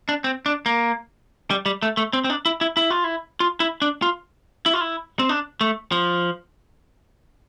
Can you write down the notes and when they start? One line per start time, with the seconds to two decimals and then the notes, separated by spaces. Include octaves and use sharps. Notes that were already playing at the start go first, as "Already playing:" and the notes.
0.09 D4
0.24 C4
0.46 D4
0.66 A#3
1.51 G3
1.66 G3
1.82 A3
1.97 A3
2.13 C4
2.24 C4
2.30 D4
2.46 E4
2.61 E4
2.77 E4
2.90 F4
3.04 E4
3.40 F4
3.60 E4
3.82 D4
4.02 F4
4.66 E4
4.73 F4
4.81 E4
5.19 C4
5.29 D4
5.61 A3
5.92 F3